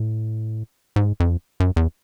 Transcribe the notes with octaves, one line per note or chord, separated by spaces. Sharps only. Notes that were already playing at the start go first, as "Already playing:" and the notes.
Already playing: A2
G#2
F2
F#2
E2